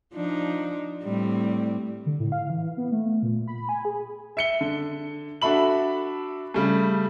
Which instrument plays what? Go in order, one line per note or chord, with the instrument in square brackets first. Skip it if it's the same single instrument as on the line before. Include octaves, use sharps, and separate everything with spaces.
[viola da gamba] F3 D4 D#4
A2 G3 C4
[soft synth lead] D3
A2
F5
E3
B3
A3
A#2
B5
G#5
G#4
[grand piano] E5 C#7 G7
D3
D4 F#4 A4 E5 B5 F#7
C#3 G3 A3